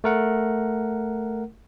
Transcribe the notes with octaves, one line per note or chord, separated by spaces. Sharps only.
A3 A#4 F#5